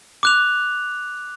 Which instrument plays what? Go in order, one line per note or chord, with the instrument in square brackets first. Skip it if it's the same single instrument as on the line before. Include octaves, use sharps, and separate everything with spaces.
[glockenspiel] D6 F#6 F7